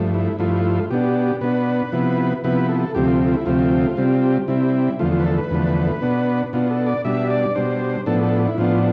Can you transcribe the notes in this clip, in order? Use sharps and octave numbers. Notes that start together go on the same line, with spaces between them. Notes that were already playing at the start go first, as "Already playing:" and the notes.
Already playing: G2 F3 A3
E4
G2 F3 A3 E4 F4
B2 B3 D4 G4
B2 B3 D4 B4
C3 F3 B3 E4
C3 F3 B3 E4 B4
A4
D2 C3 F3 A3 C4 G4
F4
F4
E4
D2 C3 F3 A3 C4 F4
C3 G3 C4
C3 G3 C4 E4
E2 D3 F3 A3 F4
F4
B4
A4
B4
E2 D3 F3 A3
B2 B3 D4
B2 B3 D4 F4
A4
D5
B2 G3 D4 E5
D5
B2 G3 D4 C5
A2 F3 B3 D4 A4
A4
E4
A2 F3 B3 D4 F4